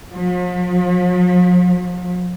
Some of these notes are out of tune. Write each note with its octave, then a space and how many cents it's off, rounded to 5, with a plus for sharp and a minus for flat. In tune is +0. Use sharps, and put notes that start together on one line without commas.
F3 +45